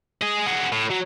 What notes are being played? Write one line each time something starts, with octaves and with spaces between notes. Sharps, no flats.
G#4 D#5
F#4 G#4
A2
F#3